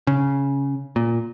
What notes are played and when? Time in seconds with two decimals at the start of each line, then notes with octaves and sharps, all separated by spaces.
0.07 C#3
0.96 A#2